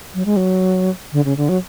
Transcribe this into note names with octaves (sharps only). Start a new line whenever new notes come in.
F#3
G#3
F#3
D3
C#3
D3
F#3